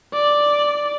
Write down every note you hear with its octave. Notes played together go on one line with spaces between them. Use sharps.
D5